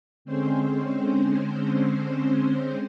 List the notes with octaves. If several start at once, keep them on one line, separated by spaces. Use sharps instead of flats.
D3 G#3 C4 C#4 C5